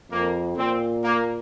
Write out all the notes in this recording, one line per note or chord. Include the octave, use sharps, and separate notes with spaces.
F2 A#3
A#2 C4
A#3